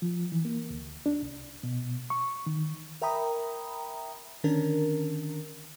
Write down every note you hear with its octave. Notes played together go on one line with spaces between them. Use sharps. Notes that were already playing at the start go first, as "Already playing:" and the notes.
F3
E3
A#3
D2
D4
C2
B2
C#6
D#3
A#4 E5 G5 A#5 B5 D#6
D3 D#3 C#4 D4 A#4